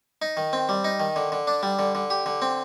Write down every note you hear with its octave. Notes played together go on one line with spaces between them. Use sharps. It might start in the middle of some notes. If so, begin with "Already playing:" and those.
D#4
D#3
C4
G3
D#4
D#3
D3
D3
D4
G3
D3
D3
G4
D3
C4